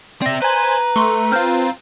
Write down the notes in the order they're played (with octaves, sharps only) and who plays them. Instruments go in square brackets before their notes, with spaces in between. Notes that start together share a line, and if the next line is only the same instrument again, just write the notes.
[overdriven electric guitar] C4 E5 [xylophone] D5 A#6
[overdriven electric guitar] B4 [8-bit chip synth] C5 G#5 [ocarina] A#5
[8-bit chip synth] A3 [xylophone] C6 C#6
[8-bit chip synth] C4 F4 [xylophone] F6 G6